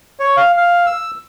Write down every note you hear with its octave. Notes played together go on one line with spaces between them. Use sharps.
C#5
F5
F5
E6